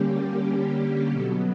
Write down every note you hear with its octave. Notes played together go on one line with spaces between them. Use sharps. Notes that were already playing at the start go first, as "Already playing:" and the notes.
Already playing: D3 G3 A#3 C#4 G4
B2 F#3 B3 A4